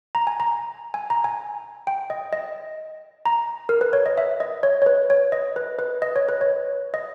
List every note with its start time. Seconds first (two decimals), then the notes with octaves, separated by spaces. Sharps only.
0.15 A#5
0.27 G#5
0.40 A#5
0.94 G#5
1.10 A#5
1.24 G#5
1.87 G5
2.10 D#5
2.33 D#5
3.26 A#5
3.69 A#4
3.81 B4
3.93 C#5
4.06 D#5
4.18 E5
4.40 D#5
4.63 C#5
4.82 C#5
4.86 B4
5.10 C#5
5.32 D#5
5.56 B4
5.79 B4
6.02 D#5
6.16 C#5
6.29 B4
6.41 C#5
6.94 D#5